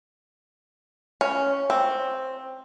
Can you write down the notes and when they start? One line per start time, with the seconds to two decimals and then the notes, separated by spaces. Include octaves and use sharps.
1.21 C#4
1.70 C4